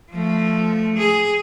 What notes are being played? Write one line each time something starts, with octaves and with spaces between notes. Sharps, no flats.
F3 A3
G#4